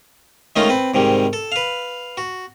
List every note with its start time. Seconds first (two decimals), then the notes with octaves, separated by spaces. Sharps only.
0.56 D#3 G#3 A3 C#4 D#4 F4
0.69 C4 B4
0.94 G#2 C3 D#3 G3
1.33 A4
1.52 B4 F5
2.17 F#4